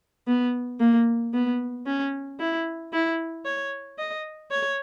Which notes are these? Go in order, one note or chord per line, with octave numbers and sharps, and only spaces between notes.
B3
A#3
B3
C#4
E4
E4
C#5
D#5
C#5